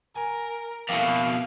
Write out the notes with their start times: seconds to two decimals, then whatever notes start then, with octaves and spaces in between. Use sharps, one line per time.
0.16 A#4 G#5
0.89 F2 B2 A#3 E4 A4 F5